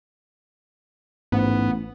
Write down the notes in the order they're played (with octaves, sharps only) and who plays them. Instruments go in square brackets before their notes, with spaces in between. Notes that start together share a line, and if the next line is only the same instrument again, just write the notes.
[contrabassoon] A1 [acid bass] G#2 [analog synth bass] B3